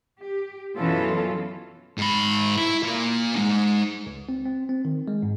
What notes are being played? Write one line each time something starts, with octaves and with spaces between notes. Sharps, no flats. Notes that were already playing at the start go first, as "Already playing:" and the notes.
G4
F#2 B2 E3 C#4 F4 A4
G#2 B5
E4
A#3 F4
G#3 D#4
C#2
C4
C4
C4
D#3
G#3
G#2